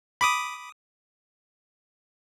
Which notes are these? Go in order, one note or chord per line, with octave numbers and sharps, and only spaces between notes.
B5 D6 D#6